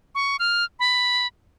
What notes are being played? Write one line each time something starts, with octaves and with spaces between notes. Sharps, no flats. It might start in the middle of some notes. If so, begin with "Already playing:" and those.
C#6
F6
B5